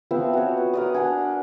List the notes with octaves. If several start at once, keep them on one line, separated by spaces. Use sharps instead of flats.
F3 B3 C4 E5
F#4 C#5
B4
A#4 D5 D#6
D4 F#5 G#5